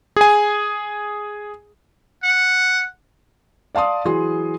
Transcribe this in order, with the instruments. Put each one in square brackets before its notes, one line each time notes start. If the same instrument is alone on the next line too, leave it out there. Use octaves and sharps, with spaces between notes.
[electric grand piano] G#4 G#5
[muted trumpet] F#5
[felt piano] D5 F5 A5 C6 D#6
E3 F#3 G#4 C6